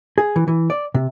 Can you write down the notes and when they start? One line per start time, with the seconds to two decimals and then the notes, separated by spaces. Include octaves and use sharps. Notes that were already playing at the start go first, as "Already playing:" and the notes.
0.18 G#4
0.36 E3
0.48 E3
0.70 D5
0.94 C3